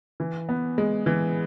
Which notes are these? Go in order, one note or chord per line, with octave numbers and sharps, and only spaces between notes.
E3
B3
G#3
E3